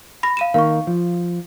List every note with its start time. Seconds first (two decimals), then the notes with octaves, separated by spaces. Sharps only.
0.23 B5 A#6
0.37 F5 D#7 E7
0.54 D#3 A#3 F5 C#6
0.87 F3